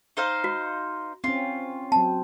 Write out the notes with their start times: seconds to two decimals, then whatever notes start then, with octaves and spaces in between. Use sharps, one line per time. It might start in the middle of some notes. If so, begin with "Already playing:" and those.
0.17 D#4 C5 F5
0.44 F#4
1.24 C4 C#4 F4
1.92 F#3 C4 A5